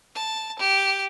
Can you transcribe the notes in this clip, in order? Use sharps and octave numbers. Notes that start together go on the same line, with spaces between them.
A5
G4